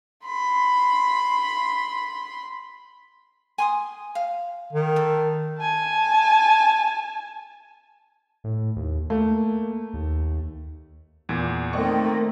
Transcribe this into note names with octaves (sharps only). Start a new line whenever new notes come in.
B5 C6
G#5 C6 D#6
F5
D#3
A4
G#5 A5
A2
D#2
A3 A#3
D#2
E2 A#2
D#3 A3 A#3 C4 D5 D#5 C#6